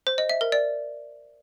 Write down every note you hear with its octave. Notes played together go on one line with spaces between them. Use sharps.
C5
D#5
E5
A#4
D5